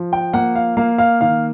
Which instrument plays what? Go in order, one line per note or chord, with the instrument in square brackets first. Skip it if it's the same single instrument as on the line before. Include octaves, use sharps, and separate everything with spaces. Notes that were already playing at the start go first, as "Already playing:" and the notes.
Already playing: [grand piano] F3
[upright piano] G5
[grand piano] A#3 [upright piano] F#5
[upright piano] F5
[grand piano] A#3 [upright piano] F5
[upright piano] F5
[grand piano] D#3 [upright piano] F5